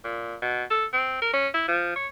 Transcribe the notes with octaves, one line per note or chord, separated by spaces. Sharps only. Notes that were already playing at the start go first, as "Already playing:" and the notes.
A#2
B2
A4
C4
A#4
C#4
E4
F3
C#5